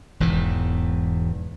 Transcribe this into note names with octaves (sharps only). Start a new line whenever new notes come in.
E1 E2 G#2 E3